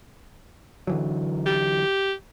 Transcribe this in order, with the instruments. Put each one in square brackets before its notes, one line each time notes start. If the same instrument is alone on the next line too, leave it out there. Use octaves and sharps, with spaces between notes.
[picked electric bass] D3 E3 F#3
[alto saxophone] G4